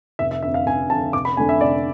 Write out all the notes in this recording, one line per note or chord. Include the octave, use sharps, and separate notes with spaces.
F1 E5
E5
F2 D3 E5
F5
F1 G#5
F2 D3 A5
F1 D6
B5
F2 D3 A3 D4 G#5
E5
F1 D5